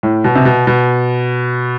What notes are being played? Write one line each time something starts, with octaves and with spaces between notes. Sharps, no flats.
A2
B2
C3
B2
B2